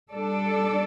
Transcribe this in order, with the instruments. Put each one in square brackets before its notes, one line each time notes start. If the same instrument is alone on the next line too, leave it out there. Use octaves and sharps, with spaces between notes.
[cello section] G3 D4 A4 D5